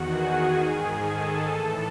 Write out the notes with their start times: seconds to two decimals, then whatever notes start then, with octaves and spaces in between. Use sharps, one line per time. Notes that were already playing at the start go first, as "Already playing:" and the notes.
Already playing: E2 D#3 F#4 F#5
0.12 G#4 G#5
0.56 G#2 D#3 G#4 G#5
1.00 A4 A5
1.45 A2 E3